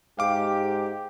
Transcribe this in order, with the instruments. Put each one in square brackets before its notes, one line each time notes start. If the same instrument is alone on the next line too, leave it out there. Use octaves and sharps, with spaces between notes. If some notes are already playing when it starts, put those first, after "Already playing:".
[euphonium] G#2 [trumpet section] G4 [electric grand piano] F5 D6